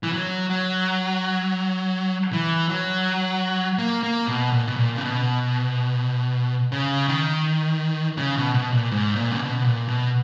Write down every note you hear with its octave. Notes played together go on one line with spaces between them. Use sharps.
E3
F#3
F#3
E3
F#3
A#3
A#3
B2
A#2
B2
A#2
C#3
B2
C#3
D#3
C#3
B2
B2
A#2
G#2
A#2
C#3
B2
A#2
B2